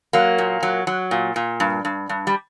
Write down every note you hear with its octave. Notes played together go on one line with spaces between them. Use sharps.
F#3 A#3
A#2
F#3
F#3
A#2
A#2
G2
G2
G2
G3